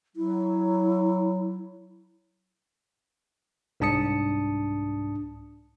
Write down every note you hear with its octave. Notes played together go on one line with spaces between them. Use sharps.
F#3 E4
C2 G#2 D4 A5 D#6 C#7